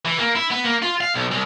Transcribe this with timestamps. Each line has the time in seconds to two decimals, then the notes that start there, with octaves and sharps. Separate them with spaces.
0.05 E3
0.19 A#3
0.35 E4
0.50 B3
0.64 A#3
0.82 F4
1.01 F5
1.14 B1
1.31 C2